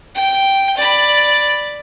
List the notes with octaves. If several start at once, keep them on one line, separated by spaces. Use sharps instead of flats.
G5
D5 B5